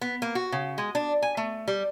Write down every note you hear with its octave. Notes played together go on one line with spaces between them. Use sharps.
B3
A#3
F#4
C#3
G#3
D4
G#5
A3
G3